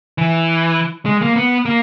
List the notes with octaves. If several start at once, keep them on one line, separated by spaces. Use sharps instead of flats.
E3
G#3
A#3
B3
A#3